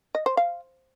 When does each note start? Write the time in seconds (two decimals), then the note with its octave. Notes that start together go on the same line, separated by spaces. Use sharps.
0.15 D#5
0.26 C5
0.37 F5